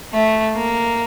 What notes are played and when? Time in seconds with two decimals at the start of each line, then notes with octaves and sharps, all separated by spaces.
0.13 A3
0.55 A#3